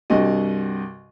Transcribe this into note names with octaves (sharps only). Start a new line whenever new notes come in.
C2 G2 G3 F#4 D#5